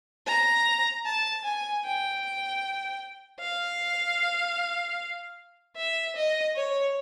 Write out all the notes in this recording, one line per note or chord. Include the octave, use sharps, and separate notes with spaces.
A#5
A5
G#5
G5
F5
E5
D#5
C#5